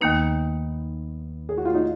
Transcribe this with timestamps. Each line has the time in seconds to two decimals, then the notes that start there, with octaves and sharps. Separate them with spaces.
0.01 D#2 D#3 A#3 B3 D#4
1.49 G#4
1.58 F#4
1.65 F4
1.74 D#4